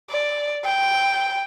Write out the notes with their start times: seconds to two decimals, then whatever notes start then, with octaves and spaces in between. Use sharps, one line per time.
0.10 D5
0.64 G5